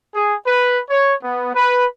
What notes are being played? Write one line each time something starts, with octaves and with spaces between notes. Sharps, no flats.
G#4
B4
C#5
B3
B4